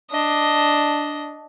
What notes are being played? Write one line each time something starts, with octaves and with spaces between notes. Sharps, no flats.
D4 D#5